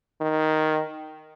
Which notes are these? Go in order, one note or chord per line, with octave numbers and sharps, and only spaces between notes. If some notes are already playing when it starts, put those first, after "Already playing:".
D#3